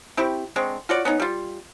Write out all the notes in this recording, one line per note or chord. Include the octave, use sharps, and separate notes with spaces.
C4 E4 G4 C#6
D3 G#3 C4 C#6
F4 F#4 C#5 D5
B3 C#4 D#4
G3 F4